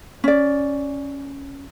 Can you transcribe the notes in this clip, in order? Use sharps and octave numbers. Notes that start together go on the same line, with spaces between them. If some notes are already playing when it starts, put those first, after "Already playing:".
C#4 D5